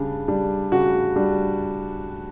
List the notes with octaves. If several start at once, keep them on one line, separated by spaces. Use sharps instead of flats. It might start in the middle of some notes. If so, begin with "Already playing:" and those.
Already playing: C#3 G3 D4
G3 D4
C#3 F#4
G3 D4